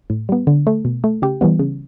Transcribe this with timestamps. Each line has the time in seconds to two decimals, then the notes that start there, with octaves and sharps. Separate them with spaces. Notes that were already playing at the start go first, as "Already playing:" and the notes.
0.10 A2
0.29 G3 B3
0.47 D3
0.67 A3
0.85 B2
1.04 A3
1.22 C#3 G4
1.41 E3 G3 B3
1.59 C#3